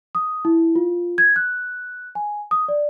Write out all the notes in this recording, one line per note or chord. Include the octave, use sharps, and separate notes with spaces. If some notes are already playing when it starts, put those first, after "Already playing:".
D#6
E4
F4
G#6
F#6
G#5
D#6
D5